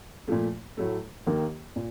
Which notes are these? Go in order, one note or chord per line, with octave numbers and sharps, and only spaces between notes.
A#2 F3 A3
A2 F#3 A3
D#2 D#3 A#3
A#2